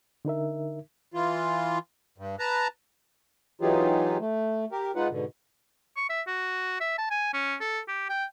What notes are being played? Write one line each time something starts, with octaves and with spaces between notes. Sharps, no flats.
D3 D#4 A#4 E5
E3 F4
G2
B4 A5 A#5
E3 F#3 D#4 F4 G4 G#4
A3
G4 A#4
G#3 D#4 F4 B4 F#5
G#2 B2 D3
C#6
E5
F#4
E5
A5
G#5
C#4
A4
G4
G5